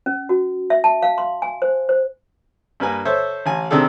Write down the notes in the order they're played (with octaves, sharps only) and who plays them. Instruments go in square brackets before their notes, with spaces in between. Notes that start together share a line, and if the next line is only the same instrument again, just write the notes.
[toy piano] C#4
F#4
E5
A5
F5
C6
G#5
C5
C5
[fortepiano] G2 A#3 B4 G#5
A4 C5 C#5 E5
A1 G#5
C3 D#3 D4 G#4 A4